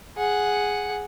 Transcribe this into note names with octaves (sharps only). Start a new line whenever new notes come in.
G#4 F#5